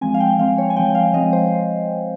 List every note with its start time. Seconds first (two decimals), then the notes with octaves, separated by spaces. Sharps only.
0.01 F3 G#3 C4 G#5
0.14 F5
0.20 G5
0.39 F3 G#3 C4 F5
0.58 C#5
0.70 G#5
0.76 F3 G#3 C4 G5
0.90 G5
0.95 F5
1.13 F3 G#3 C4 D#5
1.33 C5